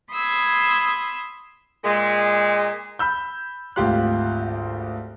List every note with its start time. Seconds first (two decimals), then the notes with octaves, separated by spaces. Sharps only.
0.12 B5 C6 D#6 E6 G#6
1.84 A#2 G#3
2.99 B5 E6 G6
3.76 G#1 D2 F4 G4 C6 F#6